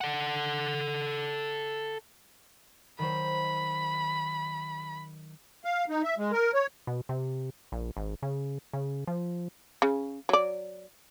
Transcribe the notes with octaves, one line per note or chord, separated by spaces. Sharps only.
A4 F#5
D#3 F#3 C5 B5
F5
D#4
E5
G#3
A#4
C#5
B2
C3
A#1
G#1
C#3
C#3
F3
C#3
F#3 D5